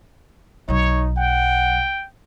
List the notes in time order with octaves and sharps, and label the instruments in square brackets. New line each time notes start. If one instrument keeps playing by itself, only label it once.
[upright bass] B1 F#3 [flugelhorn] D#4 [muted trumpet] C#5
[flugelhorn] F#5 [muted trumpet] G5